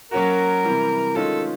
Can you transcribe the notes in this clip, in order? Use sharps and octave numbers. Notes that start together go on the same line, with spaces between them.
F#3 A#3 C#4 F#4 A#4
C3 E3 G3
D#3 G#3 C#4 F4 A4